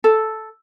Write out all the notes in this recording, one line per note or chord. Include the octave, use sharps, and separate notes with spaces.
A4